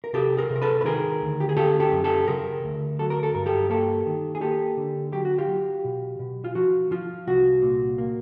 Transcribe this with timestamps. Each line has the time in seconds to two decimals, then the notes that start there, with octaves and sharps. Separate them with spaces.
0.04 A#4
0.13 C3 G4 A4
0.37 G#4 A#4
0.50 C3
0.56 A#4
0.62 A4 B4
0.81 B4
0.85 D#3 G#4 A#4
1.21 D2
1.40 G4
1.49 G#4
1.56 C#3 G4 A4
1.80 G4 A4
1.92 F#2
2.04 G4 A4
2.27 C#3 G#4 A#4
2.63 D2
2.99 F#3 A4
3.10 A#4
3.23 A4
3.34 G2 A#4
3.46 G4 A4
3.70 A#3 G4 A4
4.06 D#3
4.35 G#4
4.41 A#3 G4 A4
4.77 D3
5.13 F#3 G4
5.25 F#4
5.38 F4 G4
5.48 F#3
5.84 B2
6.19 B2
6.44 F4
6.55 F3 F#4
6.91 F3 F4
7.27 C2 F#4
7.62 A#2
7.98 A#3